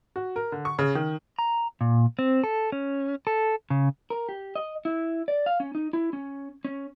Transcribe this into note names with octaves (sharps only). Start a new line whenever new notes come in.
F#4
A#4
D3
C#6
C#3
D#3
A#5
A#2
C4
A4
C#4
A4
C#3
A#4
G4
D#5
E4
D5
F5
C#4
D#4
E4
C#4
C#4